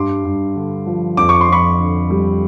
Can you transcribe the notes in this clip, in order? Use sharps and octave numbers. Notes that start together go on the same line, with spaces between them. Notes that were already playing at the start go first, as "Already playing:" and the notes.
Already playing: G2 G3 C6 D6
G2
D3
F3
F2 D6
C#6
C6
F2 B5 C#6
D3
G3